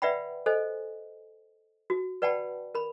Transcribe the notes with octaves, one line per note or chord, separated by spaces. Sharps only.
B4 D5 E5 F#5 G5 B5
A4 C5 D#5 G#5
F#4
B4 D5 F#5 G5 A5 B5
A#4 B5